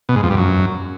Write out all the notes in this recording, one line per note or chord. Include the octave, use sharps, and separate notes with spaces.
B2
G#2
F2
G2
F#2